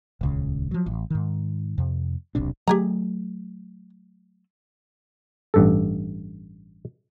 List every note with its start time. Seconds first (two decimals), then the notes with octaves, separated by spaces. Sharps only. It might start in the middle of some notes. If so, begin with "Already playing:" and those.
0.21 D#1 C#2 C#3
0.71 F3 F#3
0.86 A1
1.10 G#2 D#3
1.78 F2 C3
2.35 D#1 B1 C3 D4
2.68 F#3 A3 G4 G#4 A#5
5.54 A1 G2 A4